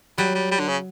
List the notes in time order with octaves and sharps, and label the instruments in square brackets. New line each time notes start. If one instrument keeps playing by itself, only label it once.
[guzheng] F#3 [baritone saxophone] G3
[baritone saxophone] G3
G3
D3
C#3